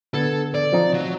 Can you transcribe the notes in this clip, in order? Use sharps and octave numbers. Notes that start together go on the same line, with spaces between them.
D3 B3 A4 G#6
D5
F3 C4 D#4
F#3